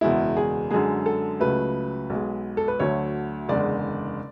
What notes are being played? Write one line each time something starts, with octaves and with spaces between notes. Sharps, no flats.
F#1 E2 B2 G#3 E4
G#4
F#2 D3 G#3 G#4
A4
C#2 C#3 F#3 A3 B4
B1 B2 G#3
A4
B4
D2 D3 F#3 A3 C#5
F#1 E2 D3 G#3 D5